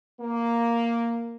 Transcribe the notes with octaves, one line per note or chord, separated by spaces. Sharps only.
A#3